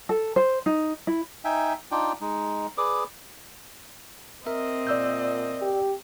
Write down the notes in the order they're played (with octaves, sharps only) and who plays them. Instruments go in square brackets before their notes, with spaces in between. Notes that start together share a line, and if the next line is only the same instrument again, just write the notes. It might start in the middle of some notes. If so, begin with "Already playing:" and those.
[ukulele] A4
C5
D#4
E4
[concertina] D#4 E5 G5 G#5
D4 D#4 F4 D5 G5
G#3 D#4
G#4 B4 D5 D6 D#6
[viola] C4 D#5 [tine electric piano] A#4 E5
[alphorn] A#2 [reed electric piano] D5 E6 G6
[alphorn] G4